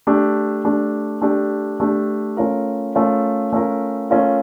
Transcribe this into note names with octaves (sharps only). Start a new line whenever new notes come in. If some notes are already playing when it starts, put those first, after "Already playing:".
A3 D4 G4
A3 D4 G4
A3 D4 G4
A3 D4 G4
A3 C#4 F4 A#4
A3 C#4 F4 A#4
A3 C#4 F4 A#4
A3 C#4 F4 A#4